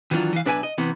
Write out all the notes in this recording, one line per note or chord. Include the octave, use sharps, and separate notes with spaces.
D#3 E3 F#3 D4 F4
E3 F5
B1 D4 B4 E5 G5 G#5
D#5
C3 E3 B3